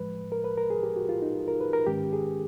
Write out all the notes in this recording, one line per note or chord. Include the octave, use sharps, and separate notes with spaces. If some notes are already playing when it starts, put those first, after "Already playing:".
Already playing: A2 F3 G#3 B4
A#4
B4
A#4
G#4
G4
F#4
F4
D#4
A#4
B4
A#4
G#2 D#3 G#3 C#4 G4
G#4